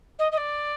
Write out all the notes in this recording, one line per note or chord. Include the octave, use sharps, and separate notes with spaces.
D#5
D#5
D5